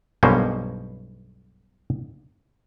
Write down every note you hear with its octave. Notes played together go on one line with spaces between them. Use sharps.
B1 G2 B2 A#3 C#4 C5